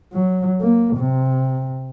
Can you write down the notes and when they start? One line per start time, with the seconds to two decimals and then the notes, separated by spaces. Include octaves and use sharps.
0.13 F#3
0.61 A#3
0.96 C3